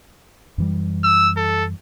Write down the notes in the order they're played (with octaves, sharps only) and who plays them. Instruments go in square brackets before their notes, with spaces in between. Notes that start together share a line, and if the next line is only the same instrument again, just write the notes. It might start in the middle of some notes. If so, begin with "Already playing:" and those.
[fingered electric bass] F#2 E3 G3
[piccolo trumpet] E6
A4